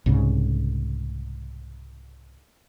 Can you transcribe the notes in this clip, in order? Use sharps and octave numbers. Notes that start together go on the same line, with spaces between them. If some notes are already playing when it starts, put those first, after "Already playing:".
C2 G#2 C#3